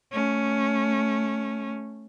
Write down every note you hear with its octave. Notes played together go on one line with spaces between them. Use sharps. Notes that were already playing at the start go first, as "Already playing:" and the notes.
A3 C#4